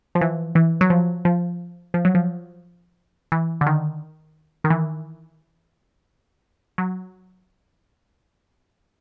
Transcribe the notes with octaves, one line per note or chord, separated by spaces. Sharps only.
F3
E3
E3
F#3
F3
F3
F3
F#3
F3
E3
D3
D#3
D#3
E3
F#3